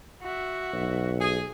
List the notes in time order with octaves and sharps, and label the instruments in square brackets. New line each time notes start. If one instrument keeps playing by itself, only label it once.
[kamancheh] F#4 E5
[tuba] B1
[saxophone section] G#4